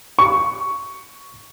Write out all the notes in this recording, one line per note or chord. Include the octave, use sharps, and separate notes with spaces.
C#6